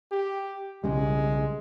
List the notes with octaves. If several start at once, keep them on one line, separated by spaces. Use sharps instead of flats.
G4
B1 C#3 G3 G#3